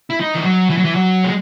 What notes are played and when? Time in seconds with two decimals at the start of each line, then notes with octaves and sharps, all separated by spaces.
0.10 E4
0.20 D#4
0.34 E3
0.44 F#3
0.70 E3
0.77 F#3
0.85 E3
0.95 F#3
1.24 G#3